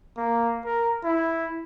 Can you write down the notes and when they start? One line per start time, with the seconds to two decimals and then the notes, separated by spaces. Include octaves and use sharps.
0.17 A#3
0.65 A#4
1.04 E4